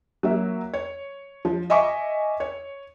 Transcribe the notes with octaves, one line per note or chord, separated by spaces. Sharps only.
F#3 A#3 E5
C#5
F3
D#5 E5 G#5 C#6 D6
C#5